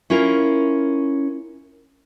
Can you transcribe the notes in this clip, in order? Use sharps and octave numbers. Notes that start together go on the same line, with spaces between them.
C#4 E4 F4 A#4